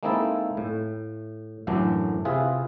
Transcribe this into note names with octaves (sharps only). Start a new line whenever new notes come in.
G#3 A#3 C4 D#4 E4 A4
A2
F#2 A2 D3 E3 F#3 D4
C3 E4 F4 G#4 B4